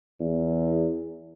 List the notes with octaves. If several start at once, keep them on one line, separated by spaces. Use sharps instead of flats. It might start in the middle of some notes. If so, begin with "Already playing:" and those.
E2